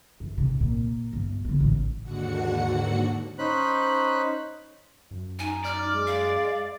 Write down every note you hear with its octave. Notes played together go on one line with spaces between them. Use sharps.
F#2
C3
A#2
G1
D3 B3
A1 G#2
D#2 G#2 D3 F#4 F#5 C#7
C#4 D#4 C5 B5 F#6
F#2
D#4 G#5
D5 F6
G#3
F5